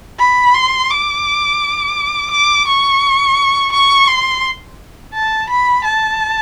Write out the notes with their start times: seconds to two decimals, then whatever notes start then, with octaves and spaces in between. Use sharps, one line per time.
0.19 B5
0.55 C6
0.90 D6
2.31 D6
2.67 C#6
3.72 C#6
4.08 C6
5.14 A5
5.49 B5
5.85 A5